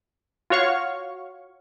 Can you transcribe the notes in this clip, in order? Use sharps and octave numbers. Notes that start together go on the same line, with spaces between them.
F4 F#4 C#5 F5 C#6